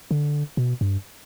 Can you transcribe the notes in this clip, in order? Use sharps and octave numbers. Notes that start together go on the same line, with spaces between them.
D3
B2
G2